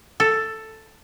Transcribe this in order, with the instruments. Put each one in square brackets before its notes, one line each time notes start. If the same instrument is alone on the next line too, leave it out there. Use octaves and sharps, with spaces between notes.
[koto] A4